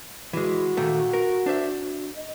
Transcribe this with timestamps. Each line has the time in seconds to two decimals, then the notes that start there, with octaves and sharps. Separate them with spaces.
0.33 E3 G#3 F#4
0.77 A#2 D#3 A3
1.13 A#4
1.46 D4 C5 E5
2.16 D#5